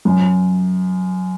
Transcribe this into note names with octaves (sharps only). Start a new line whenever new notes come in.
F#2